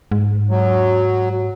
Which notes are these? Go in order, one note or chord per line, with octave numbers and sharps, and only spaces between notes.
G#2
F#3